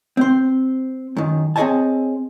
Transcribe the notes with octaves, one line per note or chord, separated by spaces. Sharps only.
C4 C5
F#2 D#3
C4 G#4 C#5 D#5 G#5 A5